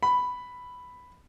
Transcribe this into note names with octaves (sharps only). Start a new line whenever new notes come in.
B5